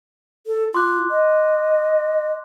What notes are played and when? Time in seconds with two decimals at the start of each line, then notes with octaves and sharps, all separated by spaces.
0.47 A4
0.74 F4 C6 D6 F#6
1.11 D#5